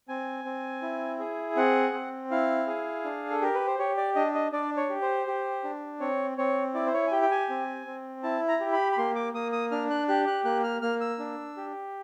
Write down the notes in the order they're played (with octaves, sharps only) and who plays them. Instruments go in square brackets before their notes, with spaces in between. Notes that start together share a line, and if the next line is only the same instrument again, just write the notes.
[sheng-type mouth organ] C4 G#5
C4
E4
G#4
C4 F#5
C4
E4 F5
G#4
D4
A4
G4 A#4
B4
C5
G4 C#5
D5
D4 D#5
D#5
D4 D5
C#5
G4
C5
G4
D4
C4 C#5
C4 C#5
E4 D5
C5
C#5
G#5
G4 G5
G5
G#5
C4
C4
E4 A5
A#5
G4
B5
B5
A#3 C6
D6
A#3 D#6
D#6
D4 F6
F#6
G4 F#6
F#6
A#3 F#6
F6
A#3 F6
E6
D4
G4